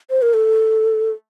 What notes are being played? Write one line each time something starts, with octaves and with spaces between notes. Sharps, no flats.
C5
A#4
A4